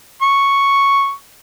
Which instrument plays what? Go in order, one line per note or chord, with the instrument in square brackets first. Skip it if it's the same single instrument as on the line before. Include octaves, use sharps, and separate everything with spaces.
[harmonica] C#6